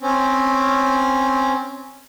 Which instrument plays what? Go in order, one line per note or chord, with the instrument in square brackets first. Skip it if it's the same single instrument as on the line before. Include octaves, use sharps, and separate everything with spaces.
[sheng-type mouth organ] C4 C#4